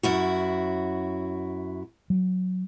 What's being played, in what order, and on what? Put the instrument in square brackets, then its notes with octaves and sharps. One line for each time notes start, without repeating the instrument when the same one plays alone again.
[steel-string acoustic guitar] F#2 E4 F#4
[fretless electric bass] F#3